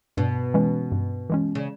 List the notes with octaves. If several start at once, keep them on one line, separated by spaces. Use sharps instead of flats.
G2 B2
E3 G#3 C#4
G2
E3 G#3 C#4
C#3